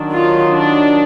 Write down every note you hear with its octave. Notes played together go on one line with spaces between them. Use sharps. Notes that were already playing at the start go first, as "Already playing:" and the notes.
Already playing: D#3 F#3 D4
F4
D4